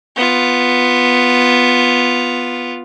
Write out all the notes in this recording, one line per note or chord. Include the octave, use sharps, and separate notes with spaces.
B3 F4